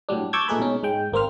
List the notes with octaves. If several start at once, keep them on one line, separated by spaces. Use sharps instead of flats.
A2 F#3 G3 D4
A5 C#6 D6 E6 G6 G#6
A#2 A3 D#4 G#4 B4 B5
B2 G#3 C#4 D#4
G#2 G#3 G5
G#1 A#3 C4 C5 F6